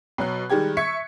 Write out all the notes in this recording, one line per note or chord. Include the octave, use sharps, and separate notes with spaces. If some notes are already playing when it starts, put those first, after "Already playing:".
B2 F#3 F#6
D#3 G3 G#3 G4 G#6
E5 C#6 G#6 B6 C#7